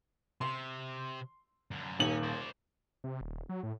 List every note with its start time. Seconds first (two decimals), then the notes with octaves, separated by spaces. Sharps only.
0.41 C3 C6
1.71 F#2 D3
1.99 D#1 D#2 C#4 F#7
2.23 C5 D5
3.04 C3
3.21 D#1
3.49 F#3
3.63 A2